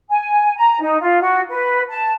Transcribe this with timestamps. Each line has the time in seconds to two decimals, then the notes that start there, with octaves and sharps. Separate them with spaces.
0.09 G#5
0.56 A#5
0.80 D#4
1.01 F4
1.21 F#4
1.49 B4
1.89 A5